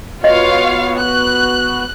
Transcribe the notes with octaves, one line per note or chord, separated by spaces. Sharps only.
B3 F4 F#4 C#5 D#5 F5
F#6